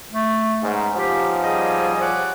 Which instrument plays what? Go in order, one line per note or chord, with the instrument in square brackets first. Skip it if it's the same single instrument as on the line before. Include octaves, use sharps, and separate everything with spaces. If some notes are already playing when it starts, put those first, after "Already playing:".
[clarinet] A3
[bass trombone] G#2 [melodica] B3 C#4 D#4
[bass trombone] F3 [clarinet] G4
[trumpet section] G3 G4 G#4 [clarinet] D#5
[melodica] C#5 D5 D6 [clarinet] F#5